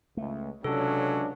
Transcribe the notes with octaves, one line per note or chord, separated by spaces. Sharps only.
C#2 A3
C#2 C3 F#3 C#4 D4 A4